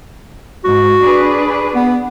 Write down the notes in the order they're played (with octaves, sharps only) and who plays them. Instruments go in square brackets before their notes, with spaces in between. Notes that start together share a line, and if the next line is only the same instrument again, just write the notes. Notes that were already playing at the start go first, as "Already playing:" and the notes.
[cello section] G#2 [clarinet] F#4
[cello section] D4 G#4 B4
[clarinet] B3